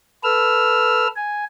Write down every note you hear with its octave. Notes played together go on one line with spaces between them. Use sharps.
A4 B4 E6 F6
G#5